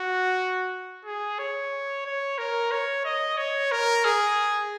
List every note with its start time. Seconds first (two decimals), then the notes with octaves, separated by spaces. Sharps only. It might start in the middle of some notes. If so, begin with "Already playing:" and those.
Already playing: F#4
1.05 G#4
1.39 C#5
2.05 C#5
2.38 A#4
2.71 C#5
3.05 D#5
3.37 C#5
3.71 A#4
4.05 G#4